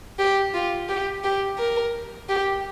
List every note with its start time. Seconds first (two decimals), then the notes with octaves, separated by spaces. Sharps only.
0.19 G4
0.54 F4
0.89 G4
1.24 G4
1.58 A#4
2.29 G4